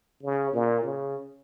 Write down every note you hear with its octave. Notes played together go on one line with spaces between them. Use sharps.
C#3
A#2
C#3